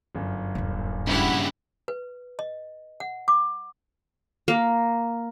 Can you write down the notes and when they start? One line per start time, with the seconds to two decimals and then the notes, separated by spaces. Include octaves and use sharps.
0.15 G1 F#2
0.55 D#1 A#2
1.07 G2 C#3 E4 G4 F#5
1.88 B4
2.39 D#5
3.00 F#5
3.28 D6
4.48 A#3